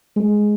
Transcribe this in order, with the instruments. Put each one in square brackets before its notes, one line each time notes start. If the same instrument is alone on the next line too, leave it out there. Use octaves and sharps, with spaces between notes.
[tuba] G#3